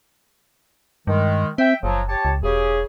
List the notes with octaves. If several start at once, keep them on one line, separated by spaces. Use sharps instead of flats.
G2 D#3 G#3
C4 E5 G5
F#1 F3 F#3
G4 C#5 A5
C#2
E1 C#3 G4 G#4